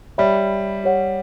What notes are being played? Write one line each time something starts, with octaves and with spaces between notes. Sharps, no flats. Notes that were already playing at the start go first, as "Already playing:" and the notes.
G3 C#5 E5 G5 B5
G4 C#5 F#5